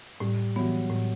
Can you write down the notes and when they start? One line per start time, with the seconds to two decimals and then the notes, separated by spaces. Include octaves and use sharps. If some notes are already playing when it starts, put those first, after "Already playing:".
0.20 A2 G3
0.56 E3 F#3 B3
0.90 A2